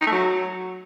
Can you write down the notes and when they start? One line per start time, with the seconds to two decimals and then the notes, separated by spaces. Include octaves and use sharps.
0.01 D#4
0.07 A3
0.12 F#3